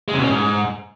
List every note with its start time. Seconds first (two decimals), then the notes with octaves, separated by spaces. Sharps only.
0.08 G#3
0.14 C3
0.19 B2
0.24 C#4
0.29 G#2